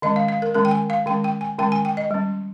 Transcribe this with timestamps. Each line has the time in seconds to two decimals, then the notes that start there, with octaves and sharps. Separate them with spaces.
0.02 D#3 G#3 C#4 D#5
0.16 F5
0.28 F5
0.42 A#4
0.55 D#3 G#3 C#4 A#4
0.65 G5
0.71 G#5
0.90 F5
1.06 D#3 G#3 C#4 G5
1.24 G5
1.41 G#5
1.58 D#3 G#3 C#4 G5
1.72 G#5
1.85 G5
1.97 D#5
2.11 G3 C#4